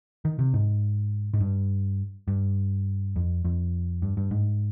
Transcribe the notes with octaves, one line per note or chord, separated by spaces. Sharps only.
D#3
C3
G#2
G#2
G2
G2
F2
F2
G2
G2
G#2